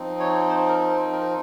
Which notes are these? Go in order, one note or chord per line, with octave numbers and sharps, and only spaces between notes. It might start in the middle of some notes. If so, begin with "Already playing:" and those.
Already playing: F3 C4 D#4
C#5
C5
A#4
C5
A#4